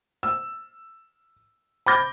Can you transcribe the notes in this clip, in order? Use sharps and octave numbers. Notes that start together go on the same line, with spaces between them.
E6
B5 D6 G6 A#6